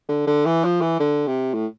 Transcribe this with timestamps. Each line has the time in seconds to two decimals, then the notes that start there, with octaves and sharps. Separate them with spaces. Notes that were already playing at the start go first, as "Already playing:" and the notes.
0.09 D3
0.27 D3
0.46 E3
0.64 F3
0.81 E3
1.00 D3
1.27 C3
1.54 A2